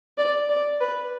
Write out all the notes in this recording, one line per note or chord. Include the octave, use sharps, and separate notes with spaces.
D5
D5
B4